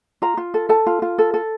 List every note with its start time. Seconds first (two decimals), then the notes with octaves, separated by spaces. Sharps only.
0.22 F4 A#5
0.37 F4
0.54 A4
0.69 A4 A5
0.87 F4
1.02 F4
1.18 A4
1.34 A4